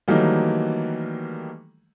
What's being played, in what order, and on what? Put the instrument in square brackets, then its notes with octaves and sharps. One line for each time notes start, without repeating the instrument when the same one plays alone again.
[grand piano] D#3 E3 F#3 G3 A3 A#3